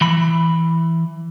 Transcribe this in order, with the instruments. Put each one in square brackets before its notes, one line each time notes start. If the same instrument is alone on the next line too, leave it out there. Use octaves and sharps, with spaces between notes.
[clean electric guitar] E3 B5